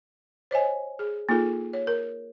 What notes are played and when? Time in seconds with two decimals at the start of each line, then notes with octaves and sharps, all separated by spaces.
0.51 C5 C#5 D#5 G#5
0.99 G#4
1.29 A#3 D#4 F4 G#4 A4
1.73 C#5
1.87 A#4